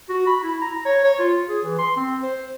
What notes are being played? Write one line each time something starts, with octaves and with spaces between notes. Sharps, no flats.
F#4
B5
E4
A#5
C#5
C#5
F4
G#4
E3
C6
C4
C5